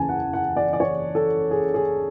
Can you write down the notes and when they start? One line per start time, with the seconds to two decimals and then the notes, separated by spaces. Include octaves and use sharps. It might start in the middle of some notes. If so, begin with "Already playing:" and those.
Already playing: F#1 E2 C#3 G#5 A5
0.09 F#5
0.33 F#5
0.56 D5
0.73 D5
0.80 C#5
1.15 A4
1.51 G#4
1.74 G#4